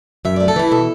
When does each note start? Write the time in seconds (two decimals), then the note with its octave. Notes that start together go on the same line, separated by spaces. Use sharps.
0.25 F#2 E5
0.36 A3 D5
0.48 A4
0.56 E3 E4
0.71 B2 A4